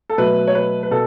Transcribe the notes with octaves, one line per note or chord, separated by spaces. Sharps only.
A4
B2 F#3 A3 B4
C#5
B4
B4
B2 A4